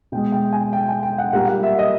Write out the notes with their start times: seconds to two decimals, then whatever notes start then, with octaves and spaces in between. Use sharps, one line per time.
0.12 B2 G#3 G5
0.32 G5
0.53 G#5
0.73 G5
0.88 G#5
1.03 G5
1.18 F#5
1.33 A#2 G3 A#3 F#5
1.48 F#5
1.63 E5
1.79 D#5